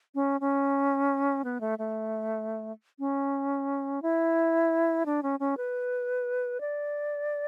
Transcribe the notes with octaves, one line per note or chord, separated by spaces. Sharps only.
C#4
C#4
B3
A3
A3
C#4
E4
D4
C#4
C#4
B4
D5